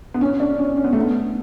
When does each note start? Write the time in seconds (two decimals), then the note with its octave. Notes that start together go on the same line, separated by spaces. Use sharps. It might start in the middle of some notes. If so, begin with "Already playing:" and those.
0.14 B3
0.21 C#4
0.40 D4
0.59 C#4
0.77 C#4
0.84 B3
0.93 A3
1.00 B3